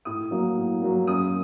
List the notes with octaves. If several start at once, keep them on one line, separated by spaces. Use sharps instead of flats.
A2 D#6
F#3 A#3
A2
F#3 A#3
F#2 D#6